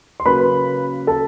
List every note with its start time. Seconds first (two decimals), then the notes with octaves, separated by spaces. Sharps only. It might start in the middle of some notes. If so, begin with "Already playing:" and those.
0.20 C6
0.26 C#3 F#3 A#3 B4 B5
1.07 A4 A5